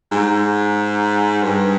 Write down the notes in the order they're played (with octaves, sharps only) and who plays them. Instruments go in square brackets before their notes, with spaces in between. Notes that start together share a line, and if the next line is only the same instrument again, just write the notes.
[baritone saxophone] G#2
G2